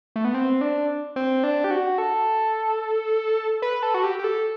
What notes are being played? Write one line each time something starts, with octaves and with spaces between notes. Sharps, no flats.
A3
B3
C4
D4
C4
D4
G4
F#4
A4
B4
A4
F#4
G4
G4
A4